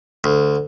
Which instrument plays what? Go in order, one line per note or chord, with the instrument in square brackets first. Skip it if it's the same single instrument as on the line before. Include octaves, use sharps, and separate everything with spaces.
[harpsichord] D2